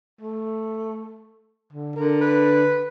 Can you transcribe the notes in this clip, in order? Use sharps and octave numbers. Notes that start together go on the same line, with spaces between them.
A3
D3
D3 A#4
B4